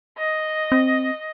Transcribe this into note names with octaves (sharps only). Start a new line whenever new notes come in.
D#5
C4